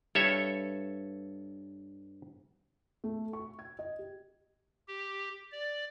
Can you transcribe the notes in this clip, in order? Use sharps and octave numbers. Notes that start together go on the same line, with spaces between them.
G2 A4 C#5 E5
A3
C#6
G#6
D#5
G4
G4
D5